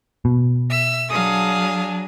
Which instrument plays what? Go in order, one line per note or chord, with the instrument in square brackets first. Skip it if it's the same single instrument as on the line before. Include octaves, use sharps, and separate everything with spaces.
[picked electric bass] B2
[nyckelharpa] E5 [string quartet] E6
[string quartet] F#3 D4 G#4 [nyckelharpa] F5 D#6